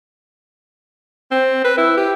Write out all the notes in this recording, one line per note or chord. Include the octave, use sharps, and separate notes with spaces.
C4
B4
E4
G4